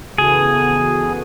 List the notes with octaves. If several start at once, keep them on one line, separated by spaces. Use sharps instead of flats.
C#3 E3 B3 F#4 G#4 A4